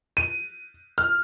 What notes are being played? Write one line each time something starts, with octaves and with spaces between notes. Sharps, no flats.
D#7
F6